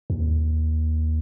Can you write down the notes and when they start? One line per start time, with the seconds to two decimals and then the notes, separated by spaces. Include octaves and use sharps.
0.10 D#2